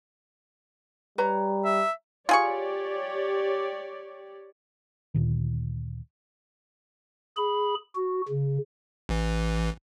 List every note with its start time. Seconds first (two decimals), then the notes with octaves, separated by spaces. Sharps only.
1.18 G3 B4 C#5 A#5
1.65 E5
2.29 F4 G4 G#4 C#5 D5 C#6
5.14 D2 A#2 D#3
7.37 G#4 B5
7.95 F#4
8.28 C#3
9.09 A1 E3